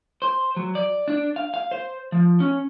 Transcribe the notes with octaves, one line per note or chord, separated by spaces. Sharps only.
C5
F#3
D5
D4
F5
F5
C5
F3
C#4